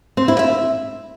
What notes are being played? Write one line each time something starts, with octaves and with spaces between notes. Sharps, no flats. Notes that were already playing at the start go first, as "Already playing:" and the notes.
C4
E4
E5